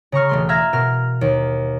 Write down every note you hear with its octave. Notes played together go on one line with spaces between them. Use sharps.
C#3 A#5 C#6 F6
E1 A3 C6
E5 F5 A#5 F6 G#6 A#6
B2 A#4 F6
D#2